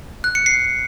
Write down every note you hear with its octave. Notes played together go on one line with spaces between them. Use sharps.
F#6
C#7
C7